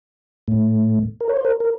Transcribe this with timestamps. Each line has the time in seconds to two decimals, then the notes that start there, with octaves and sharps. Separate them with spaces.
0.48 A2 A3
1.20 A#4
1.29 C#5
1.37 C5
1.45 A#4
1.60 A#4